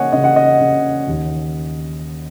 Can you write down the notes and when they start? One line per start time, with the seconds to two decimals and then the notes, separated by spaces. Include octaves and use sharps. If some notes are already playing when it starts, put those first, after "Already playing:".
Already playing: C#3 A#3 C#5 D#5 F#5 G#5
0.12 C#3 D#5
0.24 F#5
0.36 D#5
0.60 C#3
1.07 D#2